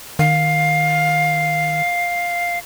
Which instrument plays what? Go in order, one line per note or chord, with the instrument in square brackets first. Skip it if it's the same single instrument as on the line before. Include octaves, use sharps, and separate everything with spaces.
[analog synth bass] D#3 [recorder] F5